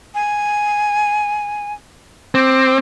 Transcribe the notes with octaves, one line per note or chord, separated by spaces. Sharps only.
G#5
C4 D6